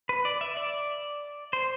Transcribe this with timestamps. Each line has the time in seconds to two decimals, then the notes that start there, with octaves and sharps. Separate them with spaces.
0.09 B4
0.25 D5
0.41 E5
0.57 D5
1.53 C5